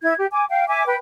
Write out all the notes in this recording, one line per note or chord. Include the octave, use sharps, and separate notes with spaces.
E4 G#6
G4
G#5 D6
F5 G5
E5 G#5 D6
B4 G5